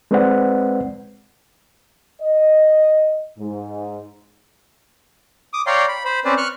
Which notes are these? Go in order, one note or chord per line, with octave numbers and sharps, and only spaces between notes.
G#3 C4 B4 C5 D5 F#5
D#5
G#2
D6 D#6
C#5 D5 F5 G5 A#5 C6
B5
C5 B5
C4 C#4 B4 C5 D5
C#6 F6 F#6